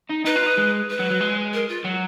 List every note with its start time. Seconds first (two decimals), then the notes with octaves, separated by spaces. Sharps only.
0.10 D#4
0.25 D#4 B4
0.36 F4
0.46 D#4
0.57 G#3
0.90 B4
1.00 F#3
1.10 F#3
1.21 G#3
1.53 A#4
1.68 F4
1.84 F#3